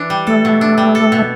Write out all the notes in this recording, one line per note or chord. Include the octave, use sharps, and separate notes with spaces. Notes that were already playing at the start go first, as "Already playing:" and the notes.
Already playing: E3 D4
G3
A3 A4
B2
D4
G3
A4
B2